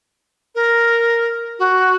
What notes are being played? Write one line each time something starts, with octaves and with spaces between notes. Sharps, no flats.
A#4
F#4